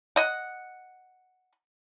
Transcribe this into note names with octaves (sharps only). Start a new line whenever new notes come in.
D#5 F#5